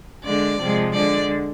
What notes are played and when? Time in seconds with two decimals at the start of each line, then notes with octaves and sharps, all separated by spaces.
0.23 D3 G#3 D5
0.59 C3 F3 G#3
0.94 D3 G#3 D5